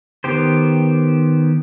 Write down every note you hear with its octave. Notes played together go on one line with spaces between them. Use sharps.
D#3 B3 G4 C5